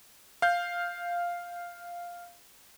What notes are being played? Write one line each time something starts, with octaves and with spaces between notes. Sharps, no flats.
F5 G6